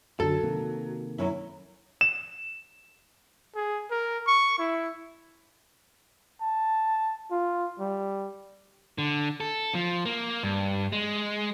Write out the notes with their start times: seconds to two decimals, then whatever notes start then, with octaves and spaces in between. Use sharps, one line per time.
0.20 F#2 D3 F#3 A4
0.43 C3 D#3 A#3
1.18 F#2 F#3 C#4 E4
2.01 E7
3.55 G#4
3.91 A#4
4.27 C#6
4.58 E4
6.41 A5
7.31 F4
7.80 G3
8.98 D3
9.40 A4
9.75 F3
10.06 A#3
10.43 G2
10.92 G#3